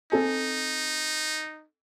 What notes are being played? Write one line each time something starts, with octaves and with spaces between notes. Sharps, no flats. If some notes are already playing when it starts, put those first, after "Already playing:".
C4 D#4 A4 G#5